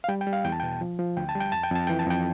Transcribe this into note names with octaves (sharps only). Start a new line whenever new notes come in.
F5
G3 G5
G5
G3
F5
E2 G5
A5
B2 G5
F3
F3
D2 G5
A5
G3
G5
F2 A5
G5
F2 A5
E3 G5
A5
F2 G5